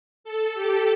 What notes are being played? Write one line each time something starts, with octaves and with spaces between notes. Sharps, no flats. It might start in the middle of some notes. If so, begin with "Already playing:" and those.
A4
G4